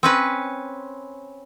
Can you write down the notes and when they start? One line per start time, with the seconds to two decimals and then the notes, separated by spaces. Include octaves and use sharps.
0.03 C4 C#4 B4